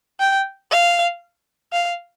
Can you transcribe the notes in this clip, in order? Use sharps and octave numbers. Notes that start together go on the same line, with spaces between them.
G5
F5
F5